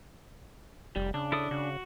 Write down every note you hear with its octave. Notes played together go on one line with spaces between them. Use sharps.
F1 G3
C#3 D4
E4 A4 D#6
C#3 F#4